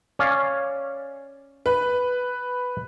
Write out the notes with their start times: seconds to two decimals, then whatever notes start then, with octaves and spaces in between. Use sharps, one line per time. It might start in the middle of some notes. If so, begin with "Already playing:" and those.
0.19 C#4 D5 F5
1.66 B4